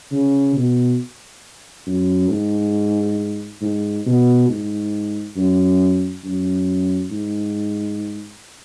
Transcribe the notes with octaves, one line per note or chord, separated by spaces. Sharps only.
C#3
B2
F#2
G#2
G#2
B2
G#2
F#2
F#2
G#2